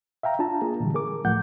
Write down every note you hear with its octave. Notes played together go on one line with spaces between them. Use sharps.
E5 F5 G5 A#5
D4 F4 A5 A#5
A#3 G#4
A#2 D3 E3 G3
G#4 A#4 D6
C#2 A2 F3 A3 F#5 G6